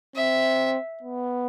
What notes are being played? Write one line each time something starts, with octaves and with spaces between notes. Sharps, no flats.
C4 E5
B3